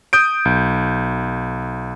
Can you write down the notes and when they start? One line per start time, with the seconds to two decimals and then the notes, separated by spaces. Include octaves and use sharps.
0.13 D#6 G6 D7
0.45 B1